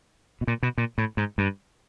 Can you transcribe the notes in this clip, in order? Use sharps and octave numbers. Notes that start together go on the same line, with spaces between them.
B2
A#2
B2
A#2
A2
G#2
G2